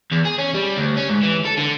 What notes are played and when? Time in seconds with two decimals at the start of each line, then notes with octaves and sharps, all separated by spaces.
0.12 E2
0.25 G#4
0.39 C#4
0.55 G3
0.77 D2
0.97 C#4
1.09 G#2
1.23 E3
1.45 A4
1.57 D3